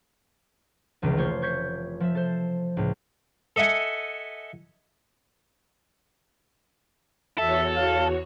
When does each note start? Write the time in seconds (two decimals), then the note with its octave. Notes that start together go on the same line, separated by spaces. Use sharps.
1.02 F1 C#2 D#3 E3
1.17 A3 F4 C5 C#5
1.42 C#6 G6 G#6 B6 C#7
2.00 F3 E5
2.15 A4 C5
2.77 C#2 A2
3.56 A4 D#5 E5 F#5 G#5
7.38 E2 F#4 A4 C#5 E5
7.76 F5